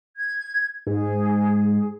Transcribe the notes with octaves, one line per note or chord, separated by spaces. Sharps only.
G#6
G#2 G#4